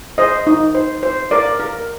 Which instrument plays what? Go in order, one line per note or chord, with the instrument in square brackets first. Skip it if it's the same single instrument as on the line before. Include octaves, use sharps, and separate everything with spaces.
[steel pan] C5 D#5
D#4
C5
C5
A#4 D5
A#4